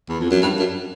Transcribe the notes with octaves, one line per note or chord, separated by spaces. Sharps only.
E2
F2
F#2
G2
F#2